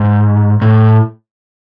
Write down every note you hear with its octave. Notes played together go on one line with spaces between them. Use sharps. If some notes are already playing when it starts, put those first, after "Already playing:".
Already playing: G#2
A2